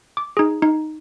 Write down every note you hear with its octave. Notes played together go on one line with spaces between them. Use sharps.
D6
D#4 G#4
D#4